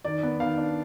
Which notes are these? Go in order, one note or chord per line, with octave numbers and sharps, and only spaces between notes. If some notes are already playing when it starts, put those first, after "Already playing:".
D#3 D5
B3
D#3 F5
D4